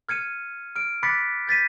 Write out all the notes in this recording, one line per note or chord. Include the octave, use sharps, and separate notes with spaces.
F6 G#6 C#7 D#7
F6 D7
B5 D6 F#6 A6 B6 C#7
G6 A6 B6 D#7